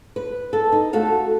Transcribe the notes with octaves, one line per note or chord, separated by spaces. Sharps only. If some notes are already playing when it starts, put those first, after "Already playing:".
B4
A4
D#4
A3 F#4 A4 F5